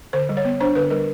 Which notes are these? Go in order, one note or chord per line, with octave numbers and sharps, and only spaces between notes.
D3 C5
G3
C#5
B3
D4 C5
D3 B4
G3 A#4